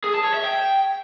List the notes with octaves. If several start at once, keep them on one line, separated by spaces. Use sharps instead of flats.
G#4
A5
C#5
E5
G5